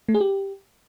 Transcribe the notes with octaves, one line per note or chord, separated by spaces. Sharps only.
A3
G#4
G4